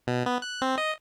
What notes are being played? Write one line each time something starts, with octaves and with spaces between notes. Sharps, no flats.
B2
B3
F#6
C4
D#5